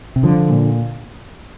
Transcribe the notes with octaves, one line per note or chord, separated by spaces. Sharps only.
C3
D3 F3
A#2